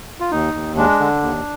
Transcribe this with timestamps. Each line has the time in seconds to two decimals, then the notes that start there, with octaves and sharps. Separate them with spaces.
0.20 F4
0.31 D#2 D#4
0.54 D#2
0.77 G#3 D4
1.00 D3
1.22 D#2